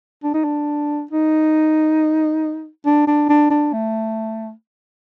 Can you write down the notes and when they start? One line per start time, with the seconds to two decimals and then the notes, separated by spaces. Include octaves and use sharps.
0.23 D4
0.34 D#4
0.44 D4
1.11 D#4
2.86 D4
3.07 D4
3.29 D4
3.51 D4
3.73 A3